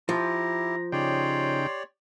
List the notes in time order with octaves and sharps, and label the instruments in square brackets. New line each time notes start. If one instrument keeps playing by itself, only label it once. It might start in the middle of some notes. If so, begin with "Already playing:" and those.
[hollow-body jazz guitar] F3 [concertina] E4 G4 [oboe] A#5
[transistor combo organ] C#3 D#4 G5 [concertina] G4 C#5 D5 [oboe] C6